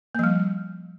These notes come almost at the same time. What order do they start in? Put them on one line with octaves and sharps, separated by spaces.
A#3 F3 G3